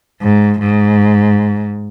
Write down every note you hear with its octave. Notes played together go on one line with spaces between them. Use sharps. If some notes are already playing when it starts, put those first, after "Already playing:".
G#2
G#2